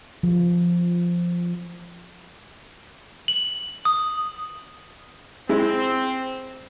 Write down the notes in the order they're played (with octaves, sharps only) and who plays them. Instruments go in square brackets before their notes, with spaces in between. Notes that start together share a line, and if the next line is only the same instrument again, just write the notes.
[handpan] F3
[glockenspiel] F#7
D#6
[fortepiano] G#3 E4 [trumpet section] C4